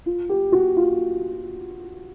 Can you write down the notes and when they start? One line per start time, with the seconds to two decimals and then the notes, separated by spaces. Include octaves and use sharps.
0.06 F4
0.29 G4
0.52 F#4
0.77 F4